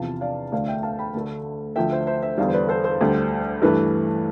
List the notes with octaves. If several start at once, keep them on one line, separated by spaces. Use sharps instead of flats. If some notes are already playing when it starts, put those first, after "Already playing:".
Already playing: E2 C3 F3 F5 A5
D5 F5
D2 D3 A3 D5 F5
E5 G5
F5 A5
G5 B5
D2 D3 A3
D2 D3 F3 A3 E5 G5
C5 E5
C5 E5
C5 E5
E2 D3 G3 D5 F5
C5
B4 D5
A4 C5
A4 C5
D2 D3 G3
G2 E3 A3 B4